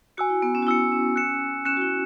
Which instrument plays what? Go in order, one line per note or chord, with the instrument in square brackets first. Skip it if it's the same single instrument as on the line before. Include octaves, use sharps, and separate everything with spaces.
[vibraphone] F#4 [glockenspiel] G#5 E6 C#7
[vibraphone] E4
B3
C#4
F#4
[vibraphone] E4 [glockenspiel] G#5 E6 C#7
[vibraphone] C#4
[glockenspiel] F#6 C#7 E7
[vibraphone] C#4 [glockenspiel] F#6 C#7 E7
[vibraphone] F#4
E4